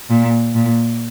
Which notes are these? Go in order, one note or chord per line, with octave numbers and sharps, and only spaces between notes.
A#2
A#2